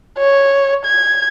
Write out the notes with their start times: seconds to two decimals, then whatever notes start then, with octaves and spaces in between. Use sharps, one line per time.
0.18 C#5
0.85 G#6